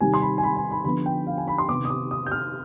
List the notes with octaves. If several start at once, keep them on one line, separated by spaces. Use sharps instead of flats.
C3 D#3 G3 C4 G#5
C6
B5
G#5
B5
G#5
B5
D3 F3 B3 B5
G5
F5
G#5
B5
C6
C3 D#3 B3 D6
D#6
D6
D#6
G6
F6